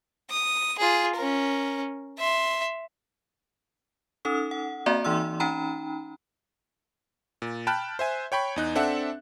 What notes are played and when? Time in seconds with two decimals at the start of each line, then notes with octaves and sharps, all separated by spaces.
0.30 D#6
0.79 F4 G#4
1.16 C#4 A#4
2.19 E5 C6
4.25 C#4 D#4 A4 D#6
4.51 F#5
4.86 A#3 C4 F#4 D5 E5 A#5
5.05 E3 D#4 C6 E6
5.40 C#4 D#4 G5 A#5 B5
7.42 A#2
7.67 G5 A5 B5 F6 F#6
7.99 C5 E5 G#5
8.32 C#5 G5 B5 C#6
8.56 E2 D#4 F#6
8.75 C4 D4 A4 E5 F#5